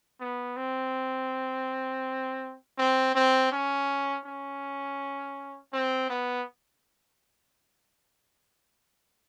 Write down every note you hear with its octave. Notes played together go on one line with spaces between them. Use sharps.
B3
C4
C4
C4
C#4
C#4
C4
B3